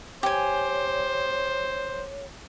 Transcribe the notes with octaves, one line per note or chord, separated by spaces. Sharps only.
G4 C5 C#5 G#5